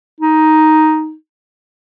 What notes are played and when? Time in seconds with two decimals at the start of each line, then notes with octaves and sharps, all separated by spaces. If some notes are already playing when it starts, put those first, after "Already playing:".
0.21 D#4